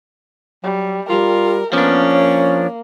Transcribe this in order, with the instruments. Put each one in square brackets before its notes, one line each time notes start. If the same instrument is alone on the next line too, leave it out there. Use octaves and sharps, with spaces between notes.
[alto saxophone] F#3 [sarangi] G3
[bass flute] G3 [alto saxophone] F4 [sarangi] A#4
[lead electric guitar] F3 D4 [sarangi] A#3 [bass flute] B3 [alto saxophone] C#4
[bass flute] C#5